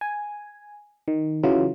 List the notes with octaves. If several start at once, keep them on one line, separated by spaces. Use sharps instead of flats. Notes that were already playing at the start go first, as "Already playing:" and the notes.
G#5
D#3
C#3 E3 F#3 F4